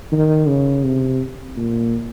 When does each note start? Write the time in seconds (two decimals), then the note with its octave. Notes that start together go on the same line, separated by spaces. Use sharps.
0.12 D#3
0.48 C#3
0.84 C3
1.57 A#2